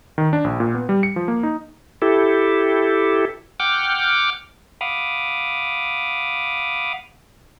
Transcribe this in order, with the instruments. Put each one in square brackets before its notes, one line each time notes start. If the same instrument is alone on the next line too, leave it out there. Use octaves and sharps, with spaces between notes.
[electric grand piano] D#3
D4
A#1
A#2
B3
G3
C#7
F3
A#3
D#4
[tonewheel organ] E4 G4 A4
F#5 G5 D6 F6
F5 F#5 B5 D6 D#6 F6